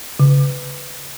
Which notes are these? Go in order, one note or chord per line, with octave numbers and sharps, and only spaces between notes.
C#3